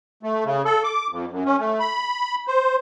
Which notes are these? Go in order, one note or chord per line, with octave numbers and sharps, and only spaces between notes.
A3
C#3
A4
D6
F2
F#2
C#4
A3
B5
C5